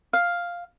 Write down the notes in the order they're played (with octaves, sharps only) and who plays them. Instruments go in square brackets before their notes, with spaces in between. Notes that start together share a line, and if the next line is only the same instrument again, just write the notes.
[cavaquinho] F5